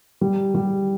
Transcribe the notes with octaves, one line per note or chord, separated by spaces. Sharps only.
G3
G3